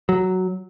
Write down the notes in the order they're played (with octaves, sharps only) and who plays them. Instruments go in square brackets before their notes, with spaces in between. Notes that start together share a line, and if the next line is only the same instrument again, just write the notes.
[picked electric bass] F#3